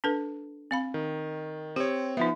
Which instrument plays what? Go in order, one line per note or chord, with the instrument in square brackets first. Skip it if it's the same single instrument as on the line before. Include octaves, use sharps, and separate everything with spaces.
[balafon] D4 A4 B4
C4 F5 B5
[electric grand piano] D#3
[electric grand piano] C4 C#5 [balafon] G4
[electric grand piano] F3 B3 [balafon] D#4 E5